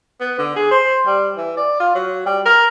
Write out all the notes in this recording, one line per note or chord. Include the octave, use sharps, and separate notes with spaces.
B3
D3
G#4
C5
G3
E3
D5
F4
F#3
G3
A#4